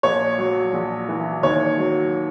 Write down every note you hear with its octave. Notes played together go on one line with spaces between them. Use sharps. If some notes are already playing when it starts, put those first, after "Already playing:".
A#1 C#5
F#3
A#1
E3
D#2 C#5
F#3